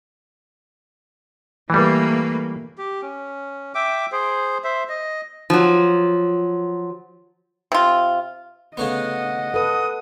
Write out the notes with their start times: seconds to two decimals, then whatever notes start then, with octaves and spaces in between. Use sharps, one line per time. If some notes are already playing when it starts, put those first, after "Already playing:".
1.70 E3 G3 A3 A#3 B4
2.78 G4
3.02 C#4
3.75 E5 G5 D6
4.12 G#4 C5
4.64 C5 E5
4.89 D#5
5.50 F3 F#3
7.72 C3 F4
8.77 C#3 A3 B3 D#5 F#5
9.54 A4 B4 D#6